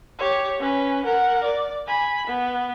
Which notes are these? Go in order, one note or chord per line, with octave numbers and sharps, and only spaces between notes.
G4 C#5
C#4 B4
A#4 F#5
D5
G#5 B5
B3